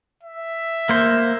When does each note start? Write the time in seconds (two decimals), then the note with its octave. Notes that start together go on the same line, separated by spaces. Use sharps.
0.23 E5
0.89 A#3 C5